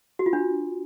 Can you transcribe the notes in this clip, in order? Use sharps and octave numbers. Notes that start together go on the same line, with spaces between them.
F#4
F4
D4